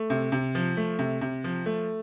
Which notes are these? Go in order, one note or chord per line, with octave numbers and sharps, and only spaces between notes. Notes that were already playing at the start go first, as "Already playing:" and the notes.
Already playing: A3
C3
C3
F3
A3
C3
C3
F3
A3